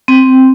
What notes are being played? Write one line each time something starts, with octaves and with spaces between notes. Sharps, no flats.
C4